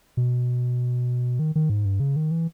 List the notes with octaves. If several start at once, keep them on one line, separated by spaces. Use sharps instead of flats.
B2
D#3
D#3
G#2
G2
C#3
D#3
E3